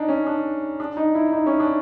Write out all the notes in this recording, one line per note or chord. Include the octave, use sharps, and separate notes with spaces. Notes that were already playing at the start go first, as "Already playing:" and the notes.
Already playing: D4 D#4
C#4
D4
D4
D#4
E4
D#4
C#4
D4